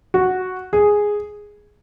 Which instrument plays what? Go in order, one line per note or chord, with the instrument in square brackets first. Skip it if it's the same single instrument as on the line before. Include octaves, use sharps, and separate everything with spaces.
[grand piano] F#4
G#4